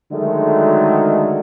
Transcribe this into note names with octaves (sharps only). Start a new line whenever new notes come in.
D3 D#3 F#3 G#3 A3